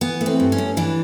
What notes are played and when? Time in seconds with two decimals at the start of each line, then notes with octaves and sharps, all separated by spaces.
0.01 E3 B3
0.21 A3
0.26 C4
0.40 G2
0.52 C#4
0.58 G2
0.77 E3 D4